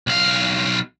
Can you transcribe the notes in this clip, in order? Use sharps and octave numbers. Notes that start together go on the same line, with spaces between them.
B1 F5